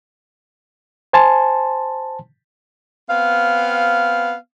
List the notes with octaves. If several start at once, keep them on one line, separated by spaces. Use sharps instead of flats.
C5 G#5 A5 C6
B3 C4 F5